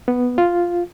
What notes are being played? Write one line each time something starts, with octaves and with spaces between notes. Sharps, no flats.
B3
F4